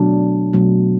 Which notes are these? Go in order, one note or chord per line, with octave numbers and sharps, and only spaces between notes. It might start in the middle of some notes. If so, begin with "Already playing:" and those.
Already playing: B2 F#3 A3 D4
B2 F#3 A3